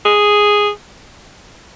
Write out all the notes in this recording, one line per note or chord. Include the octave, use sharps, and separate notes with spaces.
G#4